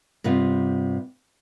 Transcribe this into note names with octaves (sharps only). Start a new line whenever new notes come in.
G2 C3 B3 F4